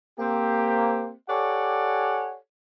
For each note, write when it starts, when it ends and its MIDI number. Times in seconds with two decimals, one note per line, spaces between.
0.19 1.12 58
0.19 1.12 60
0.19 1.12 67
1.28 2.36 67
1.28 2.36 69
1.28 2.36 73
1.28 2.36 74
1.28 2.36 78
1.28 2.36 80